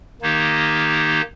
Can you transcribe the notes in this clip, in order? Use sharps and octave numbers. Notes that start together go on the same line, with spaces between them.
D#3 A#3 D#4 G4